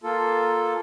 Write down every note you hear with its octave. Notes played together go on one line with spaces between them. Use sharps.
A#3 F4 A4